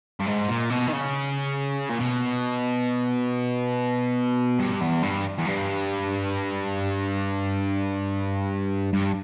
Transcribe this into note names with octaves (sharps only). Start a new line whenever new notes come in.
G2
G#2
A#2
B2
D#3
C#3
A#2
B2
G2
E2
G2
E2
G2
G2